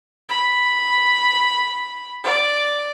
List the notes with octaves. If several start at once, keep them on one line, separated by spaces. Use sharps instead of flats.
B5
D5